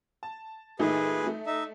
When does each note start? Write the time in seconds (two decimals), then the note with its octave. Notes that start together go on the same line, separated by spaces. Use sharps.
0.23 A5
0.79 A#2 E3 A3 D#4 G#4 B4
1.27 A3
1.47 D#4 E5